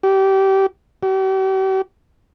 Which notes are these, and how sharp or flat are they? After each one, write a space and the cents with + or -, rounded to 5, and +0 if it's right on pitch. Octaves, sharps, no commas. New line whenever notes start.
G4 -25
G4 -45